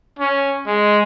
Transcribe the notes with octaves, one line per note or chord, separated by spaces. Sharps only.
C#4
G#3